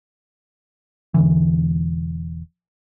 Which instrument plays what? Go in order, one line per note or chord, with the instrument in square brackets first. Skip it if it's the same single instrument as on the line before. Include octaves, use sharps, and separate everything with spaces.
[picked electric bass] E1 D3 E3